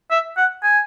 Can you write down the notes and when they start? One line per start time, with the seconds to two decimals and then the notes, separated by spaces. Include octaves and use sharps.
0.11 E5
0.37 F#5
0.63 G#5